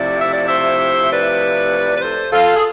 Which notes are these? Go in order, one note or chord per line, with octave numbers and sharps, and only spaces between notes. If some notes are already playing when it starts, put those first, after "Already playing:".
Already playing: C3 F3 A3 E4 D5
E5
D5
C5 E5
B4 D5
B4
A4 C5
F4 A4
G#4